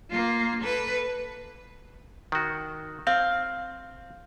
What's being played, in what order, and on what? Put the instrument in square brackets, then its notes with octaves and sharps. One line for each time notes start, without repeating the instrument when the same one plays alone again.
[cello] A#3 F4
A4 B4
[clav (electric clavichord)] D#3 F#4
[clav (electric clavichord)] C4 [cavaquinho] F5